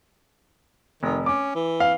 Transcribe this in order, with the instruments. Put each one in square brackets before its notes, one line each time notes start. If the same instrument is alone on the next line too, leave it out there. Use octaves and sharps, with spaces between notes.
[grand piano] F1 [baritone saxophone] D#3
[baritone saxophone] C#4 [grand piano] D6
[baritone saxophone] E3
[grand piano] F5